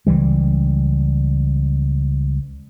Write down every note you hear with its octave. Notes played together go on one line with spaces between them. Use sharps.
C#2 E3 G3